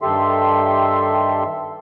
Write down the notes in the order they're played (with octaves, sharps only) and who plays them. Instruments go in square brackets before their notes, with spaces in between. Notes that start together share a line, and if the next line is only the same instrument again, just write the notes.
[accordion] G2 D#3 G4 A4 E5 C6